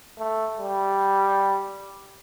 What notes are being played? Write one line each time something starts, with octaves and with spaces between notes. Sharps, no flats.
A3
G3